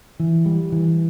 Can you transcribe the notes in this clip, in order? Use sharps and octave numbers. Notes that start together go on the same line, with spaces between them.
E3
G3
E3